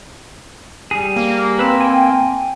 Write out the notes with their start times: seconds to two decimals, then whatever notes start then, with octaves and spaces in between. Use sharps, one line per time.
0.91 G3 G#4
1.16 A#3
1.59 C4 B4 E6
1.81 G5 G#5